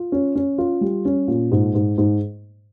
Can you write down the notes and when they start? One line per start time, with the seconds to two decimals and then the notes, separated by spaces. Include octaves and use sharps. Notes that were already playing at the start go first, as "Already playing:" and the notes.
Already playing: F4
0.12 C#4
0.36 C#4
0.58 F4
0.81 G3
1.05 C#4
1.28 A#2
1.52 G#2
1.75 G#2
1.98 G#2